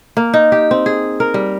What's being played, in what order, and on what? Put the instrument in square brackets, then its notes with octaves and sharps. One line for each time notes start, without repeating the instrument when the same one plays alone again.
[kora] A#3
D#4
G4
C4
G#4
A#4
G3